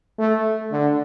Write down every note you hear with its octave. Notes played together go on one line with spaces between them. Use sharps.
A3
D3